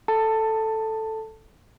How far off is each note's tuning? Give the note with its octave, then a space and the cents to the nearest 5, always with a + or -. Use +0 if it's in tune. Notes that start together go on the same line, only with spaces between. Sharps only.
A4 +0 A5 +15